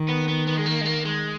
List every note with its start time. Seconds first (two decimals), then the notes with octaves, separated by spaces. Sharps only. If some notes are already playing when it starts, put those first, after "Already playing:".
Already playing: D#3
0.09 B3
0.29 B3
0.48 B3
0.57 G#3
0.67 A#3
0.82 G#3
0.86 A#3
1.05 G#3